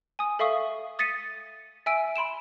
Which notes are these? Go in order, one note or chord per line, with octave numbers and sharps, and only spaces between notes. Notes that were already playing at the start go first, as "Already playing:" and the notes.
G#5 D#6
A4 E5 F5 C#6 D#6
D#6 A6 B6 C#7 D#7
E5 G#5 E6 D7
B5 C6 D7 E7